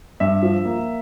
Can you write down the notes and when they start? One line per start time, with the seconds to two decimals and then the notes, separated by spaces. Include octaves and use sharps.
0.20 G2 E5
0.43 F3
0.65 A#3